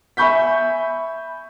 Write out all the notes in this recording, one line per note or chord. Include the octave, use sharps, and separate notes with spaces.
E5 G#5 B5 C#6 G6 B6